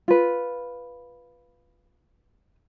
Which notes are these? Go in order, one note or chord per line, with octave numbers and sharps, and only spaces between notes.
F4 B4